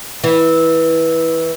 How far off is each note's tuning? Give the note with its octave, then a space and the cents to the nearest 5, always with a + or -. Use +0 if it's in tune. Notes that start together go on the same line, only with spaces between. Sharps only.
E3 -15